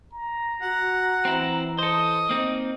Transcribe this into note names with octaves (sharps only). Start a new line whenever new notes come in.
A#5
F#4 F#5
E3 C4 E4
A4 C5 D#5
A#3 C4 D#4